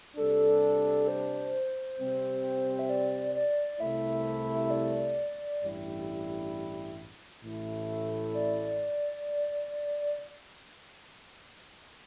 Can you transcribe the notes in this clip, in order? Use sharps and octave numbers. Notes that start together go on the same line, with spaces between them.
C3 G3 D4 A4
C5
C3 G3 C4
E5
D5
D5
C2 C3 A3 E4 E5
D5
A1 G2 G3 E4
A1 A2 A3 E4
D5